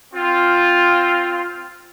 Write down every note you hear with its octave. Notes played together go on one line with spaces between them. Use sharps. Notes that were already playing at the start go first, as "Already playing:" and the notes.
C4 F4